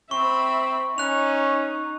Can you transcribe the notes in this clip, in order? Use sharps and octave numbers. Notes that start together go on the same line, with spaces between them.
C4 E5 B5 C#6
C#4 D#4 F#6 F7